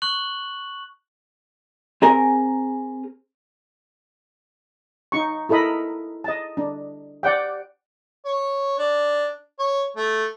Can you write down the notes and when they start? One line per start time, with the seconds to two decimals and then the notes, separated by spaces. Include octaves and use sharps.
0.02 C#6 F#6 F#7
2.02 C4 G#4 A#4 G#5 A#5
5.12 D#4 C#6
5.49 E4 A4 A#4 D#5 B5
6.24 D#5 A5
6.57 D4
7.23 D5 F#5 G5
8.25 C#5
8.78 D4
9.59 C#5
9.97 A3